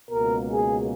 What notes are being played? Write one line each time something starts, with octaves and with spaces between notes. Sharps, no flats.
C#2 B2 A#3 A#4
G#4